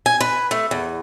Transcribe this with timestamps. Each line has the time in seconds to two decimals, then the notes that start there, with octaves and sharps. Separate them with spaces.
0.06 G#5
0.20 B4
0.51 A3
0.71 E2